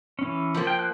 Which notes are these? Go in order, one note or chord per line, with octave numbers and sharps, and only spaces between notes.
E3 C#4
F3 A#3
G5
F#6